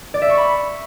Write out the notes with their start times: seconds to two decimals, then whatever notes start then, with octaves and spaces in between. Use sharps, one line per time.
0.14 D5
0.22 E5
0.30 C#6
0.37 B5